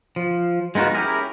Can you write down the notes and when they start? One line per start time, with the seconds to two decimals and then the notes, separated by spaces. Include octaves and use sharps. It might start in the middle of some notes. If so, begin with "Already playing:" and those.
0.16 F3
0.75 G#3 B3 D#4 F4 F#4
0.95 C#4 E4 G4 G#4 A#4